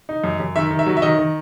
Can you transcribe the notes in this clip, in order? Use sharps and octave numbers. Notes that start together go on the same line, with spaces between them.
D#4
F#2
F#2
D#3 E5
D#3
E5
F#3
E5
D#3 D#5
D#3